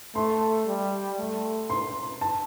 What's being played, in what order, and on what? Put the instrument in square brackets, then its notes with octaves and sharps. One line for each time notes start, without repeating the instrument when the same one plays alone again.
[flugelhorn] A3 [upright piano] C6
[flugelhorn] G3
A3
[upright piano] C6
A5